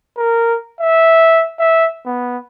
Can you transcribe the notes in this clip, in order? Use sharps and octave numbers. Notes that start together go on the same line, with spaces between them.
A#4
E5
E5
B3